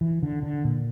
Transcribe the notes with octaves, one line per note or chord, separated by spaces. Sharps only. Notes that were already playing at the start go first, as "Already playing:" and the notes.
E3
D3
D3
A#2